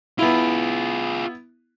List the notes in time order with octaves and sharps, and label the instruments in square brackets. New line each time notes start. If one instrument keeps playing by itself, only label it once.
[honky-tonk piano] B3 E4 [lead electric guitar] F4 G#4